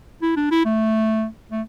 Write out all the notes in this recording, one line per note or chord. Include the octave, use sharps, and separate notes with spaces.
E4
D4
E4
A3
A3